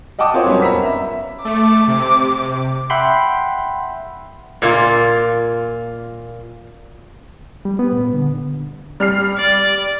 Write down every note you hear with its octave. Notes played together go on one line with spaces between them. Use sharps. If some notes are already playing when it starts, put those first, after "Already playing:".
D#5 F#5 G5 A5 D6 D#6
A#3 C4 F4 F#4 C5 C#5
F#3 G3 A#3 B3 C#4
A#5 B5 E6 B6
E5
A3 D6
C3
E5 F#5 G5 B5 C6
A#2 A#3 F4
G3
B3
A#2
D3
G3 F6 C7
D5